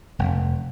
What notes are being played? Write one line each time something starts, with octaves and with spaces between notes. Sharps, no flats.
F1